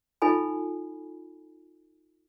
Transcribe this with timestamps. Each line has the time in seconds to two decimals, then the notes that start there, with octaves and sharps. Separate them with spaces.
0.22 D#4 F4 A4 G#5 B5